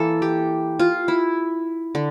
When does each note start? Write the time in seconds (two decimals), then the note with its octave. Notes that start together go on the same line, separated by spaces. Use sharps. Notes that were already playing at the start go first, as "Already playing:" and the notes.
Already playing: E3 A#3 A4
0.22 G4
0.79 F4
1.08 E4
1.95 D3